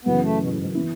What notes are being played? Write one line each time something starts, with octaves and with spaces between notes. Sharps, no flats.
F#2 C#3 E3 B3
A3
B2
A2
G#2
F#2
E3 B3 E4